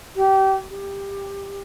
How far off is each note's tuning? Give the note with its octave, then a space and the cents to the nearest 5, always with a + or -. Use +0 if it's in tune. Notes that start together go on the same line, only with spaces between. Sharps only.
G4 -25
G4 +15